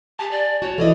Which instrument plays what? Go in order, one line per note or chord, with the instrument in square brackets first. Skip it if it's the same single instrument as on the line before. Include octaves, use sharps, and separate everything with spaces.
[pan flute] G4 [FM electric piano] G#5 A5
[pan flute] D5
[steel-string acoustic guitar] F#4 [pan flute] C#5
[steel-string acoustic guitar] E3 D5 D#5 [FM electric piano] E4 A4